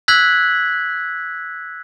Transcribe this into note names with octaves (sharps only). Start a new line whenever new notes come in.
E6 F#6 G#6 B6 F#7